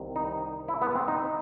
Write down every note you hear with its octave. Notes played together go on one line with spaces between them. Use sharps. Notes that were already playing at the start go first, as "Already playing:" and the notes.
Already playing: C2 C3 D#3
D#4
E4
B3
C4
D#4